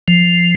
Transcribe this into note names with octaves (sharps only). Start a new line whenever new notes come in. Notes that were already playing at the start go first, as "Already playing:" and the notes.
F3